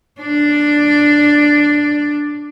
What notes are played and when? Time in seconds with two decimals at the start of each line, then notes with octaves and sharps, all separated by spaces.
0.21 D4 D5